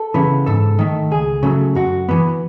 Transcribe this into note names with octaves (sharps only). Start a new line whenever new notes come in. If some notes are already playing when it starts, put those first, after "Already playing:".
Already playing: A4
C#3 E3 B3
G#2 A4
D#3 A3
C#2 G#4
C#3 F#3 A3
F#2 F#4
E3 B3